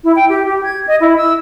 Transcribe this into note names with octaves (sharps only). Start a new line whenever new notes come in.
E4
G5
G4
G4
G#6
D#5
E4
E6